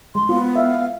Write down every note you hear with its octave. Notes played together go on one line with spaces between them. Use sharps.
G#3 C6
B3 F4
E5 F5